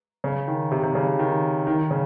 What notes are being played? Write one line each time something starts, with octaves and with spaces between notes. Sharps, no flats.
C#3
D#3
C3
C3
C#3
D#3
D#3
C#3